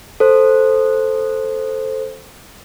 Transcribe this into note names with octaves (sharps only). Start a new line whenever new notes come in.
A4 C5